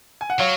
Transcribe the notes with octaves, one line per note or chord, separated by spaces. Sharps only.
G#5
F#5
F#3 C#5 F5